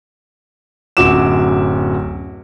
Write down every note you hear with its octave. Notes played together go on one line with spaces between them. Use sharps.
D1 F#2 F#4 D6 E7